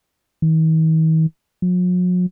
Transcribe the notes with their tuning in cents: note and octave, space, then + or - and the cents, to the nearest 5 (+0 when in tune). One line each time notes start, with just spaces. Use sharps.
D#3 +45
F#3 -45